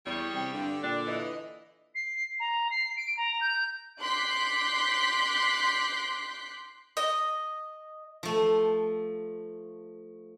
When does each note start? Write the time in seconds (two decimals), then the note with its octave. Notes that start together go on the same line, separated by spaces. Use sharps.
0.06 E2 G3 E4 G#4 C#5
0.34 C2 G5
0.54 G2 D3
0.83 A#2 D4
1.07 E3 D#5
1.94 C7
2.39 A#5
2.70 C7
2.96 D7
3.17 A#5
3.41 G6
4.00 C6 D6 F#6 G6 B6 C7
6.97 D#5
8.23 F3 A3